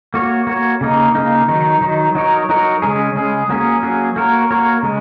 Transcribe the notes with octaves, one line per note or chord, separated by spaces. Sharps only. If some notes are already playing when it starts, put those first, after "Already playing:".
A#3 F#4 C#5
A#3 F#4 C#5
C#3 A#3 D#4
C#3 A#3 D#4
D#3 F#3 D#4
D#3 F#3 D#4
F#3 D#4 A#4 C#5
F#3 D#4 A#4 C#5
C#3 G#3 C#4 G#4
C#3 G#3 C#4 G#4
F#3 A#3 C#4 G#4
F#3 A#3 C#4 G#4
A#3 F#4 A#4 C#5
A#3 F#4 A#4 C#5
C#3 G#3